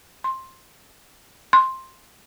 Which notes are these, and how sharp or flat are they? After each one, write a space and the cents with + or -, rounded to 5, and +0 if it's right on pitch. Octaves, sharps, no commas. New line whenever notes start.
C6 +10
C6 +5